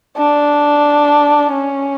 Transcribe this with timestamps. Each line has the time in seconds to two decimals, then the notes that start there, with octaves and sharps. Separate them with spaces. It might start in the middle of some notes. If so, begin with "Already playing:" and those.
0.18 D4
1.52 C#4